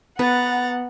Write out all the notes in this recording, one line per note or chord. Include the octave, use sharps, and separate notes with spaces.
B3 B4 F#5 A#5 A6